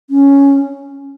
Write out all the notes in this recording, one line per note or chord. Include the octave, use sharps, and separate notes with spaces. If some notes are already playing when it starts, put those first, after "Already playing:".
C#4